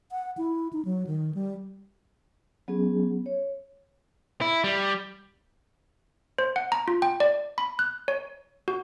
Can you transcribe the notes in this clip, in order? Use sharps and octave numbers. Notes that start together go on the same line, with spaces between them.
F#5
E4
D#4
F#3
D#3
G3
F#3 B3 C#4 G#4
C#5
E4
G3
C5
F#5
A#5
F4
G5
D5
B5
F#6
C#5
F#4